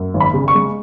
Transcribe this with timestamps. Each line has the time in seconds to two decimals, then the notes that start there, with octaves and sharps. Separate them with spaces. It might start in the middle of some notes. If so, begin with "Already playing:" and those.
Already playing: F#2
0.14 G#1
0.20 B5
0.34 C#3
0.48 C#6
0.55 G#3